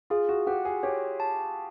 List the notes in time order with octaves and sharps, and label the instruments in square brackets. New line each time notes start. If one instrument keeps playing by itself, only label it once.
[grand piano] F4 [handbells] G#4
[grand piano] F#4
[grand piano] G4 [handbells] F#5
[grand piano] G#4
[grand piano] G4 [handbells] C#5
[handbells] A5